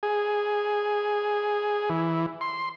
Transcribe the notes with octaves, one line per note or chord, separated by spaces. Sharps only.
G#4
E3
C6